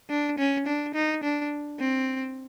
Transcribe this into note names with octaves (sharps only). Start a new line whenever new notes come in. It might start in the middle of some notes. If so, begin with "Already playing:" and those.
D4
C#4
D4
D#4
D4
C4